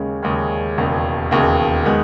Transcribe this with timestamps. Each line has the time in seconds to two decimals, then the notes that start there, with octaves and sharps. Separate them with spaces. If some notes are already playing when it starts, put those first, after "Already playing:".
Already playing: D#2 C#3 G#3 C#4
0.23 D#2 C#3 G#3 C#4
0.77 E1 D#2 C#3
1.31 E1 D#2 C#3
1.85 D#3 G#3 B3